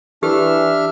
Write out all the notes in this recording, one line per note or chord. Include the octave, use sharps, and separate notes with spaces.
E3 D4 G4 E5 F6